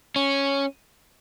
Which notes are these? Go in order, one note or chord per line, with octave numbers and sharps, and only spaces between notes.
C#4